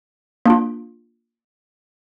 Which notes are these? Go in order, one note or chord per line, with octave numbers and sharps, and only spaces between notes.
A#3 D4 F4